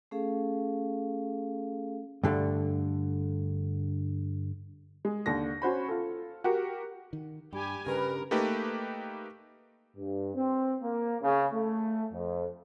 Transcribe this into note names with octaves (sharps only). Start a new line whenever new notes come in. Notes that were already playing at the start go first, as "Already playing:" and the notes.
A3 C#4 G#4 A4 F5
G2 D3 A3
G#3
D#2 D3 A#6
C#4 F#4 C5 B5
F4 A4
F#4 G4 A#4
D#3
G2 G3 G4 G#5
G2 C#3 G3 A#4 B4 B5
A3 A#3 D#4 G4 B4
G2
C4
A#3
C#3
A3
F2